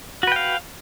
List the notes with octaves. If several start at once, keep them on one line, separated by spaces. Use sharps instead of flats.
F#4 B4 F5 G5